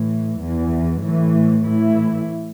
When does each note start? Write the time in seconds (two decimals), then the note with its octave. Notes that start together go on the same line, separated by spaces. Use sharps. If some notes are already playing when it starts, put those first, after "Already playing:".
Already playing: A2 E3
0.40 E2 E3
1.03 A2 E3
1.65 A2 E3 E4